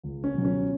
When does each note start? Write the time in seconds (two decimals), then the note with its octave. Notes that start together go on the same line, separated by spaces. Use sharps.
0.03 C#2
0.24 C#4
0.34 B2 F#3
0.45 C#4